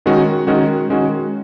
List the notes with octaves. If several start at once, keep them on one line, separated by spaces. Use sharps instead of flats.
D#3 G#3 C#4 F#4
D#3 G#3 C#4 F#4
D#3 G#3 C#4 F#4